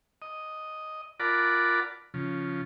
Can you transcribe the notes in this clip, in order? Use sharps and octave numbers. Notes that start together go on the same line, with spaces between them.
D#5
F4 A#4 D5 F#5 A5 B5
C#3 F3